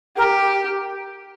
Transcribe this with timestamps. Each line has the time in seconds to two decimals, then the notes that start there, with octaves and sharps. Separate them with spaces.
0.17 G4 A#4